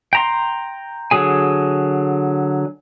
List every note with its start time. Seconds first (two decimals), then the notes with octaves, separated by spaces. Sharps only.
0.13 G5 A#5 C6
1.11 D3 F#3 G#4 G#5